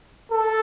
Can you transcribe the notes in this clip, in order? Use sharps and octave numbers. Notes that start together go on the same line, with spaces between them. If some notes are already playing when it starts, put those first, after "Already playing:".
A4